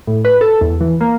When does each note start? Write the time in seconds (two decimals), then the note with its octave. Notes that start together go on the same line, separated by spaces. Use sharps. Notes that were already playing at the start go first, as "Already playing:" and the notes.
0.07 A2
0.25 B4
0.41 A4
0.61 E2
0.81 E3
1.01 A#3